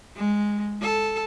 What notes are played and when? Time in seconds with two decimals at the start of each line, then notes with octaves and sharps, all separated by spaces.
0.16 G#3
0.81 A4